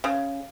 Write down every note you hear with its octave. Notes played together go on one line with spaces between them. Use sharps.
C#3